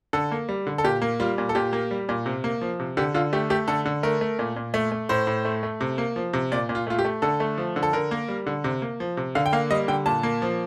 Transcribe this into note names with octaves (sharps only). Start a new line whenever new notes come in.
D3 A4
A#3
G3
D3
A4
A#2 G4
A#3
G3 F4
A#2
A4
A#2 G4
A#3
G3
A#2
C3
A#3
F3
C3
D3 G4
D3 F4
A3 G4
A3 G4
D3 A4
D3
A3 A#4
A3
A#2
A#2
A3
A3
A2 C5
A2
A3
A3
C3
A#3
F3
C3
A#2 D5
A#2
F4
A3 F4
G4
A3
D3 A4
A3
F3
D3
A4
D3 A#4
A#3
G3
D3
C3
A#3
F3
C3
D3 F5
G5
A#3 F5
G3 D#5
D3 G5
A#2 A5
A#3
F3